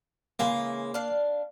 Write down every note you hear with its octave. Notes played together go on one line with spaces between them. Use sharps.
C#3 E3 G#3 A#3
D4 F5